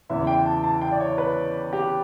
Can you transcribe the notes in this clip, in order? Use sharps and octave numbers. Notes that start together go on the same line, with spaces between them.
E2 C#3 E3 E5
G5
A5
A5
G5
D5
C#5
B4
G4